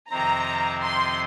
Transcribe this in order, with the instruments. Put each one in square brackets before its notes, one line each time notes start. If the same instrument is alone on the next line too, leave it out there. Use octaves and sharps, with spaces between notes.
[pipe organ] F2 C3 D#3 C4 [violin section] A#5
[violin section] C6